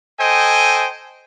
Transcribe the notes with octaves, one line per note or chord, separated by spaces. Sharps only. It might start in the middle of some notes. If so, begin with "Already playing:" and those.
A4 C5 D#5 G5 G#5